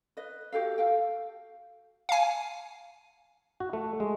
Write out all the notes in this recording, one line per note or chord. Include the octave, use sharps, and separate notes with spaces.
B4 D#5
F#4 G4 A4 F5
A4 F5 G5
F5 G#5
F#4
A3
G#3